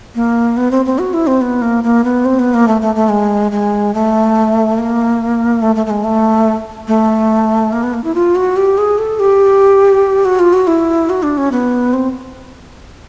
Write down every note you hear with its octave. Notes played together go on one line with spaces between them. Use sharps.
A#3
B3
C4
C4
F#4
E4
C4
B3
A#3
A#3
B3
C4
B3
A#3
A3
A3
A3
G#3
G#3
A3
A#3
A3
A3
A3
G#3
A3
A3
A#3
B3
A#3
E4
F4
F#4
G4
G#4
A4
G4
F#4
F4
F#4
E4
F#4
D4
C#4
B3
C4